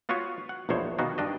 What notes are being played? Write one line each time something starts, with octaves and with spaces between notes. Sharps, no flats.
B3 F4 F#4 B4 C#5
F#5
A#1 E2 B2 C5 C#5
B2 D#3 A#3 B3 F#4
G2 D4 D#5